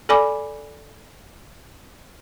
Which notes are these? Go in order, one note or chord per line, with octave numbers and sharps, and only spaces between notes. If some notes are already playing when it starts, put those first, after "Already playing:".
A4 D5 G#5 B5 D6